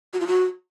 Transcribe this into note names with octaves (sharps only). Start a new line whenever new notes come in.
F#4
F4
F#4